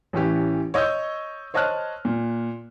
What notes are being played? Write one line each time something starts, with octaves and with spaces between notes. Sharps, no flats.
A1 E3 C#4 G4
C#5 D#5 C#6 E6 G6
C5 C#5 D#5 A5 F6 F#6
A#2